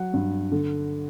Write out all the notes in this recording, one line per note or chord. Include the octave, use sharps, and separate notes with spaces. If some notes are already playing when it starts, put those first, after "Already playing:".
Already playing: F#3 F#5
G2
D3